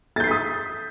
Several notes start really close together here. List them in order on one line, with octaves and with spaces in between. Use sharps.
A6 G6 C7 B6 D#6